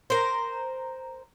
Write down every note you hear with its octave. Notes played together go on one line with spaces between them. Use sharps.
A#4 C5